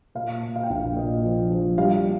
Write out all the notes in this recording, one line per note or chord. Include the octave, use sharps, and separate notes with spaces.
A#2 F5
A#2
F5
G5
A#1 F5
A#2 D#5
F3
F3
G3 F5